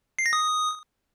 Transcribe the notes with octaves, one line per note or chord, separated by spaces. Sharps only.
C7
A#6
D#6